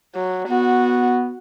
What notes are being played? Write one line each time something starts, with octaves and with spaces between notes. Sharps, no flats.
F#3
B3 F#4